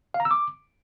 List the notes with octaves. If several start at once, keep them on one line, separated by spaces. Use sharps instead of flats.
F5
A#5
E6
D6